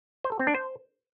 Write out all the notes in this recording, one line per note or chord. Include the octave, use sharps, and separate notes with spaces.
C5
A4
C4
D4
C5